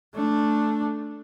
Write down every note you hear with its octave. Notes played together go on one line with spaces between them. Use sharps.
A3 D4